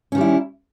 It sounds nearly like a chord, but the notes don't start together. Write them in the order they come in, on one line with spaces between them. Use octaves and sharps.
C#4 D#3 G3 E4